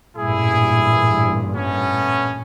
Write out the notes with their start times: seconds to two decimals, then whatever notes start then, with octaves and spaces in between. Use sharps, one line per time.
0.16 A1 G2 A#2 E4 G#4
1.55 A3 B3 C#4